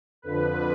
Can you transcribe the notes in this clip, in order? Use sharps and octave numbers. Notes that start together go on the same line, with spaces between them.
F2 D3 F3 B4